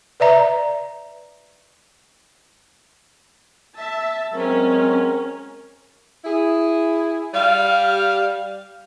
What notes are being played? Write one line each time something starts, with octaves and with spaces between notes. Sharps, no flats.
B4 D5 E5 A#5
E5 A5
F#3 G#3 C4 C#4 A#4
E4 G#4
G3 F5